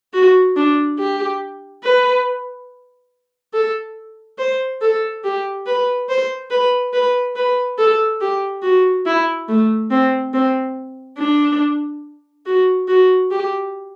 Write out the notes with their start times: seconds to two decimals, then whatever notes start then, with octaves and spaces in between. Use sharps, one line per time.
0.14 F#4
0.56 D4
0.99 G4
1.84 B4
3.54 A4
4.39 C5
4.81 A4
5.24 G4
5.66 B4
6.09 C5
6.51 B4
6.93 B4
7.36 B4
7.78 A4
8.21 G4
8.63 F#4
9.06 E4
9.48 A3
9.91 C4
10.34 C4
11.18 D4
12.46 F#4
12.88 F#4
13.31 G4